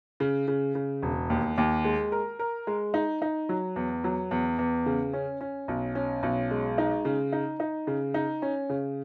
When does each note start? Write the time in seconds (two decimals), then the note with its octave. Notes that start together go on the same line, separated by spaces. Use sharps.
0.20 C#3
0.48 C#3
0.75 C#3
1.02 E1
1.30 D#2
1.58 D#2
1.85 G#3
2.12 A#4
2.39 A#4
2.67 G#3
2.94 D#4
3.22 D#4
3.49 F#3
3.76 E2
4.04 F#3
4.31 E2
4.59 E2
4.86 C#3
5.13 C#4
5.41 C#4
5.68 B1
5.95 C#4
6.23 B1
6.51 G#3
6.78 D#4
7.05 C#3
7.33 D#4
7.60 D#4
7.87 C#3
8.14 D#4
8.42 C#4
8.69 C#3